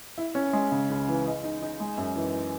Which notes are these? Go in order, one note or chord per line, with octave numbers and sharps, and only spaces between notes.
E4
C#4
G#3
C#3
C#2
E3
D#5
D#4
D#4
G#3
F#2
E3